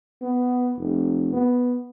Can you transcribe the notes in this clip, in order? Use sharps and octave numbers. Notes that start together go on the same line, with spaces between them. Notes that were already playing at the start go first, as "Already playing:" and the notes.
B3
F1
B3